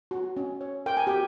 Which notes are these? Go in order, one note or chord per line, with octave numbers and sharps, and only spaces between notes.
F#4
C#4
C#5
A#4 G5
G#5
F#4 G4 G5